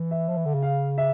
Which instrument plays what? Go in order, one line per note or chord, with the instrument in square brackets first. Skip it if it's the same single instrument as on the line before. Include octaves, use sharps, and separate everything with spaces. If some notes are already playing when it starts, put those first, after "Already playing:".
Already playing: [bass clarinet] E3
[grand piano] E5
[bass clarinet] F3
E3
D3
C#3
[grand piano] F5
E5